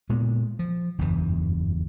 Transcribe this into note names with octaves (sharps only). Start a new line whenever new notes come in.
A#2 G#3 B3
F3
F#1 E2 G2 E3